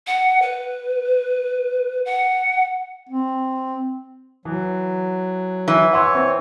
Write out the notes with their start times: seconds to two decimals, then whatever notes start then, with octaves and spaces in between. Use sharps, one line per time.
0.07 F#5
0.42 B4
2.05 F#5
3.09 C4
4.45 E3 F#3
5.68 E3
5.93 C#5 F#5 C6 E6
6.15 C4